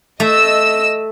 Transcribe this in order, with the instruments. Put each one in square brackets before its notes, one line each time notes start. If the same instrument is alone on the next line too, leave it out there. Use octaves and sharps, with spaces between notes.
[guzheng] A3 [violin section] D#5 E6